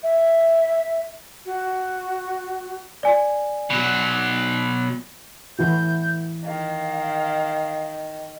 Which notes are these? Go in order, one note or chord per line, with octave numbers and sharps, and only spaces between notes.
E5
F#4
D5 G#5
B2 F#3
E3 E4 F#4 G6
D#3 F5